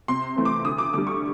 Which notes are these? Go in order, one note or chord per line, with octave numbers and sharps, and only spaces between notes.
C3 C6
E3 A3 C4
D6
D2 D#6
D6
D3 G3 D6
C#6